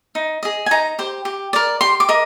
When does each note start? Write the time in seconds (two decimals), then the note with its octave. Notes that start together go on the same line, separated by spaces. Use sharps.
0.15 D#4
0.43 G#4 D#5
0.66 G#5
0.71 D#4 A#5
0.99 G4 C5
1.25 G4
1.53 A#4 D5
1.81 G4 C6
2.00 D6
2.09 A#4 D#5